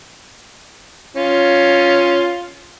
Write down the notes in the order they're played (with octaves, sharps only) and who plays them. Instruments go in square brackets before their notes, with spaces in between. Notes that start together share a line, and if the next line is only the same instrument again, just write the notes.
[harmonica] C#4 F4